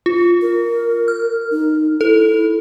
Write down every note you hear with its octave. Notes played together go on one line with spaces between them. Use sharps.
F4
A#4
F6
D#4
E4 A4